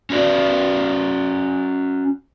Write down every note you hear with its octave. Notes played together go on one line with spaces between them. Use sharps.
C#4 F#4 D5